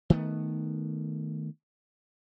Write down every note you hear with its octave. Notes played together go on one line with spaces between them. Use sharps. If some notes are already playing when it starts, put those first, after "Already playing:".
D#3 A3 B3